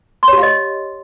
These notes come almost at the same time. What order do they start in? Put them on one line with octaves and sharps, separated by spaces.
C6 C#5 G4 F5 D#5